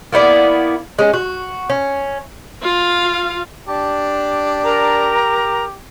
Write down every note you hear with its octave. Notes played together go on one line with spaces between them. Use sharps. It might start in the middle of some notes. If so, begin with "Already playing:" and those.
A#3 B3 E4 D5
G#3 C#4
F#4
C#4
F4 F5
D4 G4 D5 A5
A#4 A#5